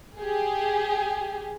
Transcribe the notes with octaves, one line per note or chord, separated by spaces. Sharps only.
G4 G#4